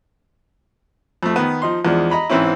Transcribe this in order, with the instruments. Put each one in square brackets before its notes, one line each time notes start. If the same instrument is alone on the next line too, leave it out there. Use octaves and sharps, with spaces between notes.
[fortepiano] F2 A3
D#3 B3
F3 D#4 C6
E2 F3 G#3 D4
D#5 A#5 B5
G#2 E3 C4 C#4 E4